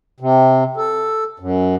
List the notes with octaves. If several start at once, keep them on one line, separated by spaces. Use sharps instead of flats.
C3
A4
F#2